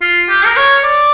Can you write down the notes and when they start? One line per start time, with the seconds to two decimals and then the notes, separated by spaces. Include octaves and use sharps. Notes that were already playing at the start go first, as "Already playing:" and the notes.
0.01 F4
0.29 G4
0.46 A#4
0.57 C#5
0.84 D5